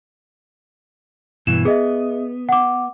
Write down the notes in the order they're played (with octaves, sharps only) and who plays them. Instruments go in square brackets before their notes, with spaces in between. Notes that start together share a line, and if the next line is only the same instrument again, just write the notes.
[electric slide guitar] G2 B2 E3 [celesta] E7
[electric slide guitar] B3 [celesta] G#4 D#5 E5
[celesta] F#5 D6